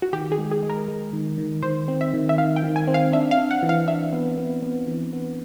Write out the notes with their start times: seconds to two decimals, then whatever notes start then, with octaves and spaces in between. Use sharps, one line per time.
0.02 F#4
0.13 D#3 G4
0.32 G#4
0.38 G#3
0.51 G#4
0.63 G#3
0.70 A#4
0.88 G#3
1.13 D#3
1.38 D#3
1.63 D#3 C5
1.88 C4
2.01 E5
2.14 D#3
2.29 E5
2.38 D#3 F5
2.56 G5
2.63 D#3
2.76 G#5
2.87 C4
2.94 F5
3.13 D4 E5
3.31 F5
3.38 D4
3.51 F#5
3.63 E3
3.69 F5
3.87 D4 E5
4.13 B3
4.38 B3
4.63 B3
4.87 E3
5.13 B3